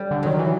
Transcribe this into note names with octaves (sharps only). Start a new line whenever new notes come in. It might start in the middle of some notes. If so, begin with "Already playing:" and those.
Already playing: G3
D3
D#3 F#3
E3